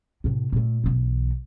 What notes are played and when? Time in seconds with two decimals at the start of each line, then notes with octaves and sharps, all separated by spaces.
0.24 A2 C3
0.52 A#2 A3
0.84 B1 E3